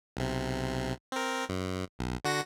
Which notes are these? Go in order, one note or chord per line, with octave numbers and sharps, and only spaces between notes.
B1 C3
C4 A#4
F#2
B1
D3 F#4 A#6